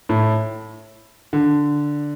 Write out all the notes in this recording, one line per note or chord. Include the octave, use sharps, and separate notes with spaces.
A2
D3